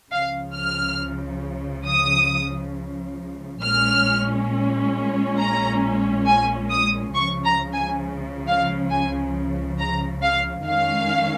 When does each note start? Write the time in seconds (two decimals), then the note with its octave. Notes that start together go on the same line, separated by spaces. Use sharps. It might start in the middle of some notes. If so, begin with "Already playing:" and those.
0.11 C#2 C#3 F3 F5
0.55 F6
1.87 D#6
3.62 A#1 A#2 G#3 C#4 F6
5.38 A#5
6.27 G#5
6.70 D#6
7.15 C#2 C#3 F3 C#6
7.44 A#5
7.73 G#5
8.47 F5
8.90 G#5
9.78 A#5
10.22 F5
10.66 F2 D#3 G#3 C#4 F5